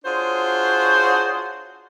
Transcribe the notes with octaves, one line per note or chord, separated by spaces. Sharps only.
D4 F4 F#4 G#4 C5 C#5